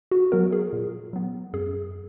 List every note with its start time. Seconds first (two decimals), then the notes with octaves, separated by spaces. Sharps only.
0.11 F#4
0.32 F#3 B3 A#4
0.52 G#4
0.73 A#2
1.13 F#3 B3
1.53 F#2 G#4